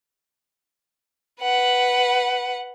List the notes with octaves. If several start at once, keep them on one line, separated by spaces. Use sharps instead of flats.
B4 F#5